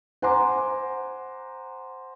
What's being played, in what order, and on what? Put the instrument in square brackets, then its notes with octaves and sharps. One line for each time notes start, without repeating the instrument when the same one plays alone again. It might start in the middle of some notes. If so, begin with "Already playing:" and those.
[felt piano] C5 F#5 G#5 A#5 C6 D6